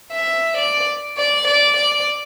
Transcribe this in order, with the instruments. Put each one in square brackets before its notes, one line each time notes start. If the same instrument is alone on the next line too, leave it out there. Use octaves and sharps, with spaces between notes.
[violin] E5
D5
D5
D5
D5